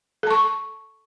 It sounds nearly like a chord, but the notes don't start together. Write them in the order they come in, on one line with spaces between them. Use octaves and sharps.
A4 A5 C#6